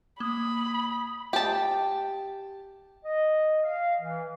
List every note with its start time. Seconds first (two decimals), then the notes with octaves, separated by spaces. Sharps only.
0.20 A#3 B5 D#6
1.33 G4 A5
3.05 D#5
3.64 F5
4.01 E3